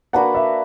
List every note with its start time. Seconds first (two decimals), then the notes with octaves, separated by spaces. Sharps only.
0.13 A#3 D4 F#4 B4 F#5
0.35 E5